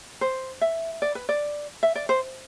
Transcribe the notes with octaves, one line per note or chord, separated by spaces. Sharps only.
C5
E5
D5
B4
D5
E5
D5
C5